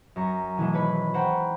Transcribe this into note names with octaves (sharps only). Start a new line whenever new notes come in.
F#2 A#5 C#6
B2 E3 G#3 A3
G#1 B4 C#5 B5 B6
C5 F#5 G5 A#5 B5 C#6